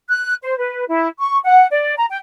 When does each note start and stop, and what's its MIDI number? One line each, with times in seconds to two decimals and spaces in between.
0.09 0.35 90
0.42 0.56 72
0.58 0.84 71
0.88 1.08 64
1.19 1.39 85
1.44 1.66 78
1.71 1.94 74
1.96 2.05 82
2.09 2.18 79